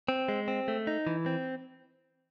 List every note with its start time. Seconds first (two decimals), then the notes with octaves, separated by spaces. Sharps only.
0.09 C4
0.28 G#3
0.48 C4
0.68 A3
0.87 D#4
1.07 E3
1.26 C4